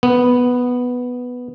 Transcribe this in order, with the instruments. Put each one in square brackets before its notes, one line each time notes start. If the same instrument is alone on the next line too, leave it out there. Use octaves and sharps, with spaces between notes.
[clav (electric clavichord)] B3